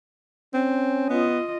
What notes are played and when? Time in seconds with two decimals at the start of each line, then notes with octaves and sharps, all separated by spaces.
0.54 C4 C#4
1.10 B3 F4 D#5